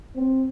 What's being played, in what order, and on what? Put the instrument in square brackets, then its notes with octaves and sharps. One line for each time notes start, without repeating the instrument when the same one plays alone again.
[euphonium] C4